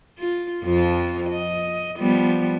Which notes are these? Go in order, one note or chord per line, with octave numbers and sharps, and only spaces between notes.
F4
F2 F3 F4
D#5
F3 G3 B3